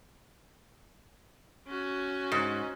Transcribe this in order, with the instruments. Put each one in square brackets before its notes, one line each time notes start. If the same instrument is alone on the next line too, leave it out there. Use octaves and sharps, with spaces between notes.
[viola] C#4 F#4
[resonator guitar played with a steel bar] G#2